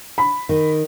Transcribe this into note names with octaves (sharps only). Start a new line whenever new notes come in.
B5
D#3